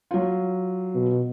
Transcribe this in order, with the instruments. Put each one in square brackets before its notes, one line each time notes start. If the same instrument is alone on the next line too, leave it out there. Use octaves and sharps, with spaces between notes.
[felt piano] F#3 F4
[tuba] B2